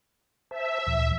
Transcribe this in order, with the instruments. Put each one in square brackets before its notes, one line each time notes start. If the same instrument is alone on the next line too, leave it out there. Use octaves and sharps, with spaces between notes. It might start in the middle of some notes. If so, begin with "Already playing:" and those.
[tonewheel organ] C5 A5 [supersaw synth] E5
[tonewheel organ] D2 A#2 E3